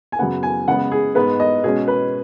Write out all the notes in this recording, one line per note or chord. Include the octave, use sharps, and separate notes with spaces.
G#5
F#2 C#3 B3 F#5
G#5
C#3 G#3 B3 F#5
G#4
G#2 G#3 B3 B4
D#5
B2 G#3 C#4 G#4
B4